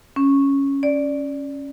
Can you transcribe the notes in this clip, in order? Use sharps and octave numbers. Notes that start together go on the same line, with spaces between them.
C#4
D5